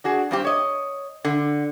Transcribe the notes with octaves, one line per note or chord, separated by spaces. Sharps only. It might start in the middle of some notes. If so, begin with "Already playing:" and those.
D4 F#4 G#4
G2 C4 G4
C#5 D#5
D3